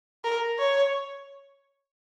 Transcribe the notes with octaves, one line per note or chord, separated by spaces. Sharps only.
A#4
C#5